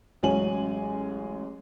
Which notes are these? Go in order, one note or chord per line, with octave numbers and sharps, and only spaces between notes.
A1 F#3 G#3 C#4 G#5 F#7